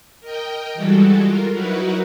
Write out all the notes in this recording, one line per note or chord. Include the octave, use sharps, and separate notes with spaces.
A#4 D#5 G5
E3 G3 G#3 F#4 A4
F4 A#4
F#3 D#4 E4 F#4 A#4 B4